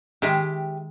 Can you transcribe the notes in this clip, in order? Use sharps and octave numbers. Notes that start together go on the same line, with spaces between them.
D#3 G#3 G4 E5 G5